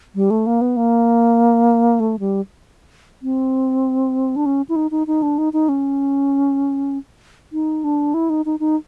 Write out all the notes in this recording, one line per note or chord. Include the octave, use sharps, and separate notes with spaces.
G3
A3
A#3
B3
A#3
A3
G3
C4
D4
C#4
E4
D#4
D#4
D#4
D4
D#4
D#4
C#4
D#4
D4
E4
D#4
D#4
D#4